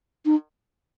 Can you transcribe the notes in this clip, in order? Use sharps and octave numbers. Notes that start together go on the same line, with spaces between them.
D#4